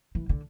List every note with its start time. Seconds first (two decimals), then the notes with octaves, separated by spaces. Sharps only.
0.15 E3
0.29 D3